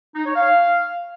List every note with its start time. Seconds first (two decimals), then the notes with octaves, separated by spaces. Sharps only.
0.15 D#4
0.25 C#5
0.36 F5